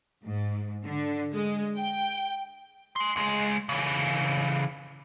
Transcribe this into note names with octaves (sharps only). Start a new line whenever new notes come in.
G#2
D3
G#3
G5
G#5 C6
C#2 G#3
C#3 E3